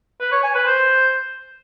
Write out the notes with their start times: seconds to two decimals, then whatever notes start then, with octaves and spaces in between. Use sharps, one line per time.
0.20 B4
0.32 C#5
0.43 G#5
0.55 B4
0.66 C5